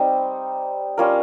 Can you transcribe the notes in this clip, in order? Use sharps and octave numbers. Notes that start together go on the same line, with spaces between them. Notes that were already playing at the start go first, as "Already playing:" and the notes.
Already playing: G3 C4 D#4
G3 C#4 F4 A#4